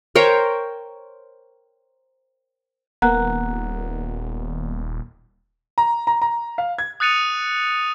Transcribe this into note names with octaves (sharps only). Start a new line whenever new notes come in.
A#4 C5 C#5 G5
D#1 A#3 B3 F#5 A#5 F#6
A#5
A#5
A#5
F5
G#6
D#6 F#6 A6 C#7 D#7 F7